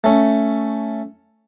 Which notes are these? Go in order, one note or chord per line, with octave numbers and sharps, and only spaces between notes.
A3 C#4